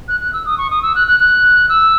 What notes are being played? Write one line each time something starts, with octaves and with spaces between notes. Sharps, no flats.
F#6
F#6
E6
D#6
C#6
D#6
E6
F#6
F#6
F#6
E6